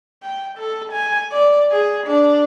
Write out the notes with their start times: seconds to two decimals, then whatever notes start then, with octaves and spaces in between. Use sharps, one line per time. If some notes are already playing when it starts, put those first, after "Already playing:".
0.23 G5
0.58 A4
0.93 G#5
1.32 D5
1.72 G#4
2.07 D4